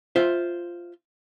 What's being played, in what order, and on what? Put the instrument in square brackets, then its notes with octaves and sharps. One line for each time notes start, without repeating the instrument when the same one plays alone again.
[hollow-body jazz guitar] F4 C5 E5